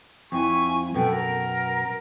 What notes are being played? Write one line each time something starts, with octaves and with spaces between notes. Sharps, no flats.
F2 E4 G#5 C#6
F#2 B2 A4 B4 G5
A#4